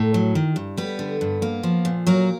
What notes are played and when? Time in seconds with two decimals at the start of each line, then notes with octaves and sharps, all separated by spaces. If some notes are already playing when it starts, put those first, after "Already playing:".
Already playing: A2 A#4
0.14 F#3
0.35 D#3
0.56 G2
0.77 G3 B3 B4
0.99 D3
1.21 G2
1.42 A#3
1.63 F3
1.85 A#2
2.07 F#3 A#3 A#4